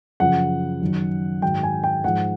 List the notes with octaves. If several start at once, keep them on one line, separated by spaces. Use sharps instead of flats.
F#2 C#3 F3 F#5
F#2 D#3 F#3
G#2 D#3 F#3 G5
G#5
G5
G#2 F3 F#5